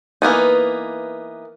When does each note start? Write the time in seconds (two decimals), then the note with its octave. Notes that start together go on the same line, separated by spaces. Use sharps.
0.22 E3 A#3 B3 D#4